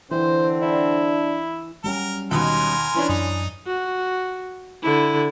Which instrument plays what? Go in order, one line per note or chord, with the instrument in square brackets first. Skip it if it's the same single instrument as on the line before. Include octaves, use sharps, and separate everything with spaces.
[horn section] D3 C4 [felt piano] E3 [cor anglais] C5
[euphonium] D4 [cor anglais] E4
[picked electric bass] F#3 G3 C#4 [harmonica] A#4
[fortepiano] D#2 B2 D#4 [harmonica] A#4 G#5 [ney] C6
[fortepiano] E3 C#4 D4
[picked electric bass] F#2 [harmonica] D#4 D#5
[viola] F#4
D3 E4